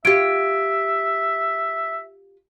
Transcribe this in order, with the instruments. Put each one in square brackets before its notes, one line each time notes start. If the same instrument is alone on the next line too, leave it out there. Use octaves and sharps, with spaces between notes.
[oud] F4 G4 [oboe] E5 [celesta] G#6 D7